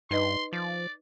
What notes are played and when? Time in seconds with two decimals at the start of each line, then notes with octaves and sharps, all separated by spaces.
0.11 G2 D#4 B4 D#5 C6
0.53 F3 D5